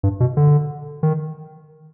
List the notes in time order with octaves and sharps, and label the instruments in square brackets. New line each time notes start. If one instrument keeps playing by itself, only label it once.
[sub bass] G2
B2
D3
D#3